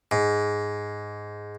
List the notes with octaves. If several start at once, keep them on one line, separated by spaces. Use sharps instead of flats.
G#2